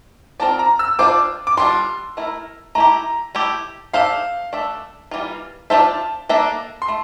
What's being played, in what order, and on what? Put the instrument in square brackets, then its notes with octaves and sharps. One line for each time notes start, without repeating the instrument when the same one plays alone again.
[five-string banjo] C4 F4 A#4 D5 [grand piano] A5
[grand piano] A#5
E6
[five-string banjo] D4 F4 C5 [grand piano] D6
[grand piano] D6
[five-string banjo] G3 D4 F4 [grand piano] C6
[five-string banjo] A3 E4 A#4
[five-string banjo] A3 E4 G4 [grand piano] A#5
[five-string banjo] A3 E4 G4
[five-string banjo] D4 A4 C5 E5 [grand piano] F5
[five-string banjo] A3 D4 A4 E5
E3 G3 A#3 F4
[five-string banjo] D4 F4 C5 E5 [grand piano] A5
[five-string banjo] A#3 D4 A4 E5
[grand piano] C6
[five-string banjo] A3